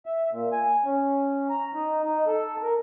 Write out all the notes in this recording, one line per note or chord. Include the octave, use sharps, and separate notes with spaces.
E5
A#2
G#5
C#4
A#5
D#4
D#4
A4
A#4